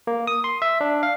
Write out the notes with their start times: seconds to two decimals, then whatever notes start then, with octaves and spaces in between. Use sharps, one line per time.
0.07 A#3
0.27 D#6
0.44 C6
0.62 E5
0.81 D4
1.03 F5